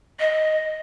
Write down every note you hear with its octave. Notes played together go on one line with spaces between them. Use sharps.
D#5